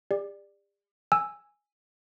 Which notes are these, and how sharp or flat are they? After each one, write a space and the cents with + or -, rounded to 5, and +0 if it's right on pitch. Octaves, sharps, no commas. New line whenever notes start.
G4 +45 D5 +10
G#5 -5 E6 +0